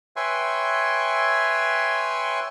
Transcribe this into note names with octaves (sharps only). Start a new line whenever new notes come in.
B4 C#5 E5 G5 G#5 C6